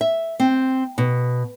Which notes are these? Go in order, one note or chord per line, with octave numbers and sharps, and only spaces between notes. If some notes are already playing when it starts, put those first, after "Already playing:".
E5
C4
B2